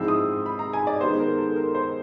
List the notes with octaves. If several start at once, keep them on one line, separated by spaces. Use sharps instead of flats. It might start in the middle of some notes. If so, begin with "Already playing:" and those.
Already playing: G#2 F3 G#3 C4 E4 E6
D#6
B5
A#5
G#5
D5
D#3 G#3 B3 C5
A#4
A4
A#4
C5